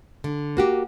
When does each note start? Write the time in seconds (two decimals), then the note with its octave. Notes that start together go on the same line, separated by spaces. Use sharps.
0.24 D3
0.57 A#3 F#4 G4